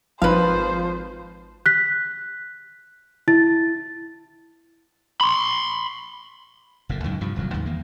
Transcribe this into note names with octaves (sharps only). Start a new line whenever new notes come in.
G#1 F3 B4 C5 F5
F#6 B6
E4 A6
B5 C6
F#1 A#2 D3
C#2 F#2 A2 D#3
G2 C3 F3
D#1 C2 F2 F#3
D#2 G#2 C#3
E2 D#3 A#3